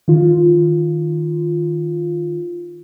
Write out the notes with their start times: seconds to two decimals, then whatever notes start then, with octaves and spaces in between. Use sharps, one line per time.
0.08 D#3 F4